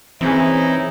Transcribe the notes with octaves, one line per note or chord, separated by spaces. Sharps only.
E3 C4 C#4 D#4 E4 G#4